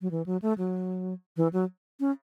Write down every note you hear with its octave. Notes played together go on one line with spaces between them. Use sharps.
F#3
E3
F#3
A3
F#3
E3
F#3
C#4